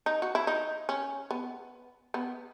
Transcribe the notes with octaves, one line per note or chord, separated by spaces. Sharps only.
D#4
F#4
E4
D#4
C#4
B3
B3